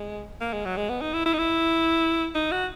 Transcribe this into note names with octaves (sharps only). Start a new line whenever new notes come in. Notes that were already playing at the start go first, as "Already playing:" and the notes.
Already playing: G#3
A#3
G#3
F#3
G#3
B3
D#4
E4
E4
D#4
E4
D#4
F#4